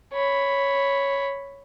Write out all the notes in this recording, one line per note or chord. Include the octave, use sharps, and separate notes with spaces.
C#5 B5